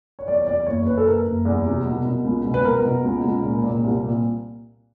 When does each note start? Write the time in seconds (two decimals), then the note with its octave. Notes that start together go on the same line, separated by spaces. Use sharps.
0.19 C#5
0.28 E2 D5
0.47 E2 D5
0.66 F#1 C#5
0.86 F#1 B4
0.97 A4
1.07 F#1 A#4
1.27 F#1
1.45 E2
1.65 C3
1.85 B2
2.05 B2
2.24 C#2
2.45 B2
2.54 B4
2.65 B2 A#4
2.85 B2
3.04 C#2
3.24 C#2
3.43 A#2
3.64 A#2
3.84 C2
4.03 A#2